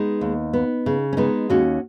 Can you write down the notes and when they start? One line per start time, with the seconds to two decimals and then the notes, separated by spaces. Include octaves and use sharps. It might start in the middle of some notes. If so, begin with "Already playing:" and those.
Already playing: G#3 B3 D#4
0.21 D#2
0.53 B3
0.86 C#3
1.13 C#4
1.17 G#3 B3 D#4
1.50 D#2 C#4 F#4